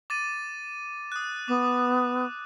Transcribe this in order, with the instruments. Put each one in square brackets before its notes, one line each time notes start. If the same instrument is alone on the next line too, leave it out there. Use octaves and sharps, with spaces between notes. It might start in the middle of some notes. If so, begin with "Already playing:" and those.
[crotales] D6 A6 D#7
D#6 F#6
[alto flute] B3 [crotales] D6